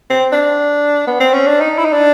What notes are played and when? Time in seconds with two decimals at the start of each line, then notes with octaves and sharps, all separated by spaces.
0.10 C4
0.32 D4
1.07 B3
1.20 C4
1.33 C#4
1.46 D4
1.61 D#4
1.78 E4
1.85 D#4
1.92 D4